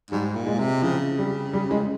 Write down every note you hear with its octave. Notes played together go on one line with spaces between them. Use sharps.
G#2 G3
A#2
G#3
C3
C#3 F3
G3
G3
G#3